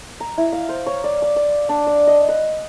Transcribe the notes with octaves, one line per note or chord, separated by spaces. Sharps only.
A#5
E4
F5
C5
C#5
D5
D6
D5
D4
D5
D#5
B4